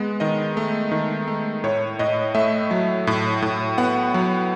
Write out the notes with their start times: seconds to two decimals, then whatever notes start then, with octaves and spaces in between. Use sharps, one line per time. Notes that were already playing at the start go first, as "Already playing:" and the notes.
Already playing: G#3 B3
0.20 D#3 D#5
0.57 A3
0.92 D#3
1.28 A3
1.64 A2 C#5
1.99 A2 D#5
2.35 A3 E5
2.71 F#3
3.07 A2
3.42 A2
3.78 B3 F#5
4.14 F#3